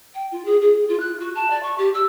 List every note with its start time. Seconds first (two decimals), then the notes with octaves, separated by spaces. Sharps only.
0.14 G5
0.31 F4
0.44 G#4
0.60 G#4
0.88 F4
0.99 F#6
1.19 F#4
1.34 A5
1.50 D5
1.62 C#6
1.77 G4
1.93 E6